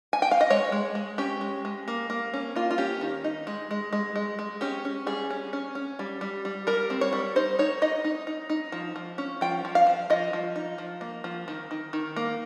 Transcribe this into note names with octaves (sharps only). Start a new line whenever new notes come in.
G#5
G5
F5
D#5
G#3 C#5
G#3
G#3
C#4 G4
G#3
G#3
A#3
A#3
C#4
A#3 F4
F4
C#4 G4
D#3
D#4
G#3
G#3
G#3
G#3
G#3
C#4 G4
C#4
G3 G#4
C#4
C#4
C#4
G3
G3
G3
G3 A#4
C4
C#5
G3
D#4 C5
D#4 C#5
D#4 D#5
D#4
D#4
D#4
F3
F3
C#4
F3 G5
F3
F5
F3
F3 D#5
F3
D#4
F3
A#3
F3
D#3
D#3
D#3
A#3